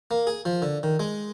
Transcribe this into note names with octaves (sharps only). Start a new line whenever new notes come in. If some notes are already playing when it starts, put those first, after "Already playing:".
A#3
G#4
F3
D3
D#3
G#3